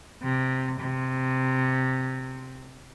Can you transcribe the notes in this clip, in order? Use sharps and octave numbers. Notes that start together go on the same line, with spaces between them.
C3
C3